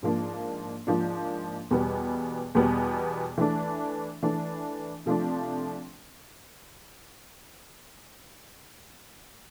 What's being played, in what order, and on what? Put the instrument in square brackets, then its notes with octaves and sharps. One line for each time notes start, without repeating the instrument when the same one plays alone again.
[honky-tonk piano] G#2 F3 A#3 D4
G#2 F3 A#3 D4
E2 B2 G3 B3
E2 B2 G3 B3
E3 A3 D4
E3 A3 D4
C3 F3 A3 D4